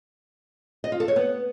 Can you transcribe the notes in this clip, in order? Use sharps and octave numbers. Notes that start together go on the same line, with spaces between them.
D#5
F4
A4
C#5
B3